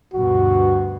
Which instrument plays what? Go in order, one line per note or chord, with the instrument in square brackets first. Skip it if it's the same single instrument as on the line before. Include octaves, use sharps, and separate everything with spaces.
[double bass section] D2 G2 B2 [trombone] F#4